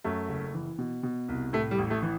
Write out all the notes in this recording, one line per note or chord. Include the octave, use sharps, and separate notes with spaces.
F#2 A3
F#1
E3
B2
B2
C2
A2 A3
G3
A1
A3
E3